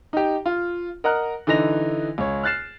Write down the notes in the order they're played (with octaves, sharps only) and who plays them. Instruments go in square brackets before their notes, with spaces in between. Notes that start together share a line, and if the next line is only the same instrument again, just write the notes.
[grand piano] D#4 G4
F4
A#4 D#5 F#5 A#5 F6 F#6
D3 E3 D#4 A#6 F7
C#2 C#5
F6 F#6 A6 C7 E7